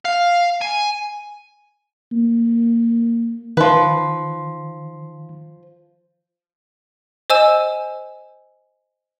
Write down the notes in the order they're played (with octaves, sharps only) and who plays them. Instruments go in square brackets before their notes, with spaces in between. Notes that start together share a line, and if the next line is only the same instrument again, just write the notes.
[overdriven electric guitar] F5
G#5
[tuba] A#3
[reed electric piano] D#3 C6 [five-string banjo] F3 B4
[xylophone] C5 D#5 G#5 E6 E7